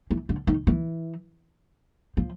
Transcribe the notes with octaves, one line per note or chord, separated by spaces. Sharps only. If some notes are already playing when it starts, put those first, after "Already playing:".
E3
D3
D#3
E3
F3